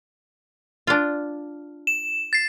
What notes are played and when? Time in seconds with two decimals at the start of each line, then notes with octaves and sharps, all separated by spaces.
0.87 D4 F4
1.87 E7
2.33 A6 C7